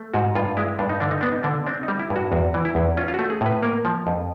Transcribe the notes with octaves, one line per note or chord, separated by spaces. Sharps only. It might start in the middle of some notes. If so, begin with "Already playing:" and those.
Already playing: A3
G#2 F#4
G2 F4
G#3 E4
G2 D4
D#4
D3 D4
D#4
B3 D4
D#4
D3 D4
C4 D4
D#4
G3
E4
G2
F#4
E2 F#4
E3
E4
E2
C#4 F4
F4
A3 F#4
G#4
A2 B4
A#3 A#4
F3
F2